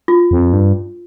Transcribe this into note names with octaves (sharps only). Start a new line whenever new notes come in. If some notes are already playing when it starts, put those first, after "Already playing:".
F4
F2
G2